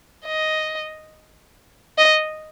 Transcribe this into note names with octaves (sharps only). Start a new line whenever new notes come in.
D#5
D#5